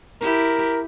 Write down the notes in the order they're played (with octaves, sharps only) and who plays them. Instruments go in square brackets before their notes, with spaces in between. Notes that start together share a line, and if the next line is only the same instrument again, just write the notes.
[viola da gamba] E4 G4 [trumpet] A#4